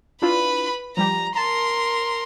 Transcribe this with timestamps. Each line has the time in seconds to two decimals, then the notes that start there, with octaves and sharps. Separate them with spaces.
0.22 D4 E4 F4 B4 B5
0.97 F3 G3 G4 A#5
1.35 A#4 A5 A#5 C6